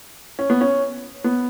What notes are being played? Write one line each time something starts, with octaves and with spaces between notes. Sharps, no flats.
C#4
B3
C#4
B3